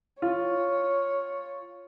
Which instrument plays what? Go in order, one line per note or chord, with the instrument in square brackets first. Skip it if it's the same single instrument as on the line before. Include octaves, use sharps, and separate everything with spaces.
[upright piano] F4 [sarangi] C#5